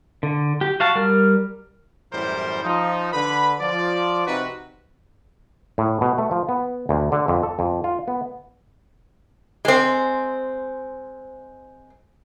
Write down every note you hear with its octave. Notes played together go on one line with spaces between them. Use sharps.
D3
G4
F#4 F5 A5
G3 A#4 F6
F#2 A2 E3 G3 A#4 C5
F3 D#4
D3 B4 B5
F3 D5
C3 C4 D#4 F#4 B4
A2
B2
A3
F3
B3
D2
D3
F2
A4
F2
F4
B3
G#3 C4